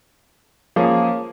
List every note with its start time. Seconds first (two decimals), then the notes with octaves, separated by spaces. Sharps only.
0.76 F3 A#3 C#4 G#4